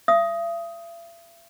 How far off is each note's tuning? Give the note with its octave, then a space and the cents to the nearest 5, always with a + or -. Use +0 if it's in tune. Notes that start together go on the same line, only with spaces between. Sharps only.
E5 +45 D#6 +10